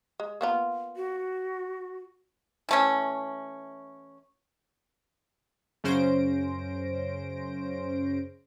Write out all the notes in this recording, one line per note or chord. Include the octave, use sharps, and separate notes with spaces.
G#3
A#3 B3 F4
F#4
E3 A3 C#4
F#2 C#3 C#4 C5 A#6 D7